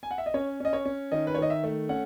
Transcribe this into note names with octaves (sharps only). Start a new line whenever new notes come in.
G#5
F#5
E5
D#5
C#4 C#5
C#4 D#5
C#5
C#4
D#3 D#5
B4
C#5
D#3 D#5
E5
A3
C#4 F#5